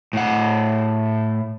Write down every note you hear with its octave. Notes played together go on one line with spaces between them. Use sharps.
A2 F#5